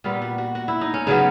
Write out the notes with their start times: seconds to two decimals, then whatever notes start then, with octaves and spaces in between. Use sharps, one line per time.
0.04 A#2 G3 B3 F4
0.22 F#4
0.38 F#4
0.55 F#4
0.68 E4
0.81 D#4
0.94 C#4
1.07 C#3 F#3 B3 D#4